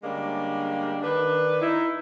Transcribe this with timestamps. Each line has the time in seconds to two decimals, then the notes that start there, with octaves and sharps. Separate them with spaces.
0.03 D3 G3 G#3 A#3 C#4 D4
1.03 D#3 D4 B4
1.62 D#4 E4